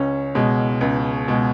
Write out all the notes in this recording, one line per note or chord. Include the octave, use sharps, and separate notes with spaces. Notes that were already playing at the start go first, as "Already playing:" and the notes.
Already playing: C#2 C#4
B2 G#3
C#2
B2 G#3